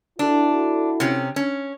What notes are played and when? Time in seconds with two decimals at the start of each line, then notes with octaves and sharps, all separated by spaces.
0.19 D4 E4 F#4 A4
1.00 C3 C#4
1.36 C#4